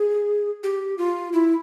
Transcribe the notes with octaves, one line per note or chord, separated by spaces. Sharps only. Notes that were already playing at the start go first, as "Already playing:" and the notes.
Already playing: G#4
G4
F4
E4